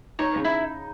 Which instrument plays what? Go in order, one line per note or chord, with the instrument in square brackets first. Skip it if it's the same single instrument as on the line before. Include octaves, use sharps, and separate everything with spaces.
[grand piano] D#4 [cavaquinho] C#5
[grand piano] C#3
[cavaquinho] E4